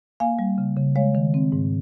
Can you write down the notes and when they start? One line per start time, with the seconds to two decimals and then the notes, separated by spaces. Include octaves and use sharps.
0.20 A#3 F5 G#5
0.39 G3
0.58 C#3
0.77 C#3
0.95 G#3 C#5 F5
1.15 D#3
1.34 C4
1.52 G#2